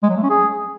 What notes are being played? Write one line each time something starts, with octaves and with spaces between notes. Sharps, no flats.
G#3
F#3
A3
C#4
G#4